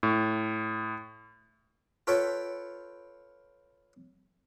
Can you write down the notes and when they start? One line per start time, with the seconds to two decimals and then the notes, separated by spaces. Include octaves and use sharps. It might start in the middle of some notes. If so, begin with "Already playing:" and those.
0.03 A2
2.07 F4 A4 B4 C#5 G5 B5